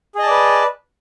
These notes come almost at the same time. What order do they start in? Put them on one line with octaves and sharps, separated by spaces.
G#4 D#5 A5 D5 B4